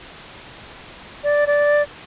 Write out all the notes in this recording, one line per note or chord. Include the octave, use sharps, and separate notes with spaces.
D5
D5